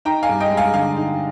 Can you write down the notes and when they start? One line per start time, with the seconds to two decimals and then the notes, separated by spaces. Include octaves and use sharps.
0.05 D#4 G5 A#5
0.23 F5 G#5
0.29 G2
0.40 D#5 G5
0.51 G#3
0.57 F5 G#5
0.74 D3 F5 G#5
0.97 D#4